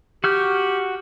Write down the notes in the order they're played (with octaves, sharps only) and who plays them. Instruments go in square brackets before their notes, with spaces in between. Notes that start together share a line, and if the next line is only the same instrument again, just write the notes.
[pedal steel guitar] F#4 F6 G6 [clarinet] G4